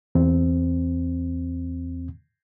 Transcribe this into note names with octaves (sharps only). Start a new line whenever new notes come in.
E2 C4